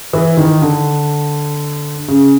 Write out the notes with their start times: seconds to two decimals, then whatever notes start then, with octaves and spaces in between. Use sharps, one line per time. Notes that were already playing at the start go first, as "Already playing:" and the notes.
0.13 E3
0.37 D#3
0.62 D3
2.08 C#3